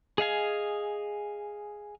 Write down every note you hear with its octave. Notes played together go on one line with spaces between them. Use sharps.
G#4 D#5 F5 G#5